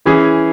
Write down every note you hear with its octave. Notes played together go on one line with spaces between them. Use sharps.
E3 C#4 E4 G#4